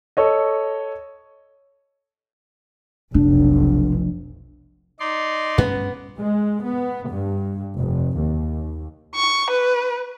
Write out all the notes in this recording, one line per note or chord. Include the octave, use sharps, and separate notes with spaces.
A4 C#5 D#5
F1 B1 D4
D#4 D5 C6
G2 B3 C#4
G#3
B3
G2
F1
D#2
C#6
B4